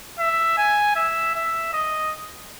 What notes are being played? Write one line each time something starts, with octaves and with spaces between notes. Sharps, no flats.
E5
G#5
E5
E5
D#5